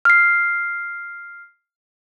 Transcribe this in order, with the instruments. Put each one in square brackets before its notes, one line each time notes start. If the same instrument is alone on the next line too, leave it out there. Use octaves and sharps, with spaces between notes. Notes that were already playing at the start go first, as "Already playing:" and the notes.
[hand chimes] F6 C7